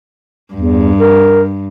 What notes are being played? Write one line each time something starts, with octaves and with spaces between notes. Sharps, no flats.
E2 G2
A#4